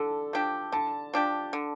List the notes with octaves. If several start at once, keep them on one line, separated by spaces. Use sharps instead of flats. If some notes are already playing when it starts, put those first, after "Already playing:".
Already playing: D3 A4
F3 D4 G4
D3 A5
F3 D4 G4
D3